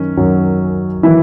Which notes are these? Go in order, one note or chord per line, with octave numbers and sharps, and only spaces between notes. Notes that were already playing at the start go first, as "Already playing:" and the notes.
Already playing: F#2 D#3 C#4
F#2 D#3 F#3
D#3 E3 F#3 E4